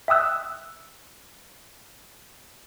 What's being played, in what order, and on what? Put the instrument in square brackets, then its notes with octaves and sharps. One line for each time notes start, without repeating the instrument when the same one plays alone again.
[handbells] E5 G5 D#6 E6 F#6